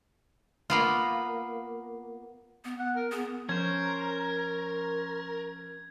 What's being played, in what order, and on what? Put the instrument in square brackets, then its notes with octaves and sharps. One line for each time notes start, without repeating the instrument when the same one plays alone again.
[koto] A#3 B3 F4
[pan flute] B3
[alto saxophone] F#5
A#4
[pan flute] B3 [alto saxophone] G#4
[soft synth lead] F3 [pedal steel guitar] C#4 C5 [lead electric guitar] A#4 [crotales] G#6